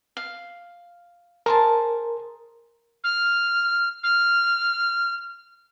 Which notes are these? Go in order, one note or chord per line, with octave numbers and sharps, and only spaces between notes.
F5
G#4 A#4 C5 A5
F6
F6